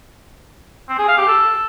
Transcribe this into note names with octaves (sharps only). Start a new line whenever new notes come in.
C4
G#4
F5
G4
A4